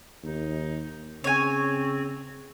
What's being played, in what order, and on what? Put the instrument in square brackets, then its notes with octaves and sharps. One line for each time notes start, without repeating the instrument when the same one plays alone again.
[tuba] D#2 [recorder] D#4
[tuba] C#3 [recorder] C4 [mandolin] C#5 G#5